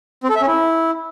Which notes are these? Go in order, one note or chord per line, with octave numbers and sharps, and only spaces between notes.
C4
A4
E5
C#4
E4